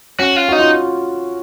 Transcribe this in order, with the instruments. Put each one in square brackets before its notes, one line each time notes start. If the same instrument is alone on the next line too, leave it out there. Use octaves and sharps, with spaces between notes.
[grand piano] C#4 [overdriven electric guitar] F#4
[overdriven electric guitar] F4
[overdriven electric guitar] D#4 [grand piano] F#4
[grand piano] F4